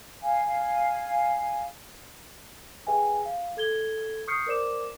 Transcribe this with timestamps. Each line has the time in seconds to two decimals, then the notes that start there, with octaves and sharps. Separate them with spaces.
0.22 F5 G#5
2.87 G#4 B4 E5 G5 G#5
3.25 F5
3.57 A4 G#6 G7
4.27 C#6 D#6 F6 G6 C7 C#7
4.46 A#4 C5 D5 D6 E7